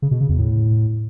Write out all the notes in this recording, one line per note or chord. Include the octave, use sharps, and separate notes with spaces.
C#3
B2
C#3
E2
A2